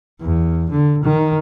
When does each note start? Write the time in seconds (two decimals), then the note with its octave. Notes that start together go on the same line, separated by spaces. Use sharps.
0.21 E2
0.70 D3
1.04 D#3